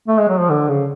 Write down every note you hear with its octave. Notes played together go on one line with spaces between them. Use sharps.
A3
G#3
F#3
F3
D3
C#3